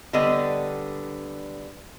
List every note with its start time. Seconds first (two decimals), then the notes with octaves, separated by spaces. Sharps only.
0.13 D3 G3 B3 D4 D#5